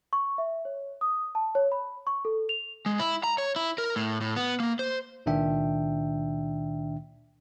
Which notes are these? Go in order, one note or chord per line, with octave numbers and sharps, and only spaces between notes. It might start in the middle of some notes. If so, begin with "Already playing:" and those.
C#6
E5
C#5
D#6
A5
C#5
B5
C#6
A4
F7
G#3
E4
A#5
C#5
E4
A#4
A2
A2
B3
A#3
C5
C#2 A#2 D#3 D4 E5 G5